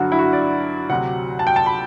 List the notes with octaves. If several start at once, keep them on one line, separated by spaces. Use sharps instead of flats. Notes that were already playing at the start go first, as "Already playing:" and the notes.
Already playing: G2 D3 F#3 F#4
E4
F#4
D5
D2 C3 F#3 F#5
A5
G5
A5
B5